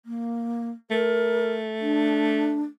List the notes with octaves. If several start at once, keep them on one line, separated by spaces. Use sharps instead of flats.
A#3
A3 A#4
D4